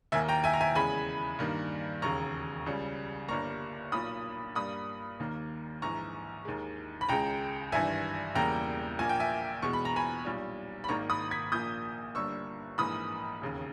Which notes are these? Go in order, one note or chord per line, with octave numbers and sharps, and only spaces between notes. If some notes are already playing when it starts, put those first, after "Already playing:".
D#2 D#3 A#3 E5 G#5
G5 A#5
E5 G#5
A#5
E5 G#5
E2 C#3 G#3 G#5 B5
G2 D#3 G3 A#3
E1 D#2 C#3 A#5 C#6
C#2 C#3 G3
G1 G2 G3 A#3 A#5 C#6
B1 A#2 A#3 B5 D#6
G2 G3 A#3 B5 D#6
D#2 D#3 A#3
A#1 G#2 E3 A#5 C#6
D#2 D#3 G#3
B5
C#2 C#3 G#3 G5 A#5
G#1 G2 E3 E5 G#5
E1 E2 C#3 G3 A#3 G5 A#5
A#1 A#2 A#3 G#5
G5
E5 G#5
E2 B2 G#3 C#6
B5
A#5
G#5 B5
B1 A#2 G3
B5
G#1 G#2 D#3 A#3 A#5 C#6
B5 D#6
G#6 B6
A#1 A#2 A#3 D#6 G6
G1 G2 G3 A#3 C#6 E6
A#1 G#2 E3 A#3 B5 D#6
E1 D#2 C#3